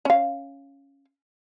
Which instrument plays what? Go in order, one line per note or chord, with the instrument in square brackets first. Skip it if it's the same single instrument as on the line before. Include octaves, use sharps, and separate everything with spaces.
[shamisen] C#4 F5